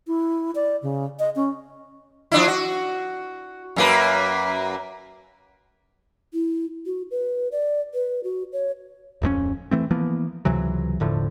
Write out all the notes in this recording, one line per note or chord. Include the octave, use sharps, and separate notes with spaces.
E4
D5
C#3
D#5
C#4
F3 D4 E4
F#4
F#2 A#3 B4
E4
F#4
B4
D5
B4
F#4
C#5
D1 F2 G#3 C#4
E3 A3 C4
E3 F3 A#3 B3
C#2 C3 E3 F#3
E1 A2 D3 F3